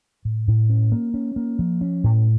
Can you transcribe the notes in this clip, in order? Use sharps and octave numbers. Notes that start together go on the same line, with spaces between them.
A2
A2
C#4
A#3
C#4
A#3
F3
C#4
A2